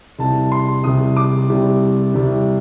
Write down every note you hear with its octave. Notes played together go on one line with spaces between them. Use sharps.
C2 C3 G3 A5
C6
C2 C3 G3 D#6
D6
C2 C3 G3
C2 C3 G3